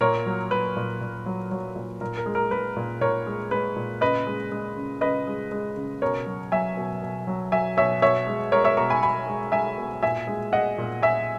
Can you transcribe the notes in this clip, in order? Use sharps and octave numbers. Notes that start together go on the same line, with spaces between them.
A#2 A#4 C#5
F#3
F#3 B4
A#2
A#2
F#3
F#3
A#2
A#2 A#4
A#4
G#3
A#4
G#3 B4
A#2
A#2 A#4 C#5
G#3
G#3 B4
A#2
C#3 B4 D#5
G#3
G#3
C#3
C#3 B4 D#5
G#3
G#3
C#3
B2 A#4 C#5
F#3
F#3 E5 G#5
B2
B2
F#3
F#3 E5 G#5
B2 C#5 E5
B2 C#5 E5
G#3
G#3 A#4 C#5
C#5 E5
B2 A#5 C#6
G#5 B5
B2 G#5 B5
G#3
G#3 E5 G#5
B2
A#2 E5 G#5
G#3
G#3 D#5 F#5
A#2
A#2 E5 G#5